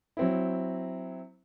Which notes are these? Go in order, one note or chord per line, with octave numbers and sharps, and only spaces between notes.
F#3 C4 E4